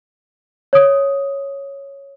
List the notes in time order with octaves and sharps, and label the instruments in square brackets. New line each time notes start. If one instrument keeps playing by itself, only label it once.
[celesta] C#5 D#6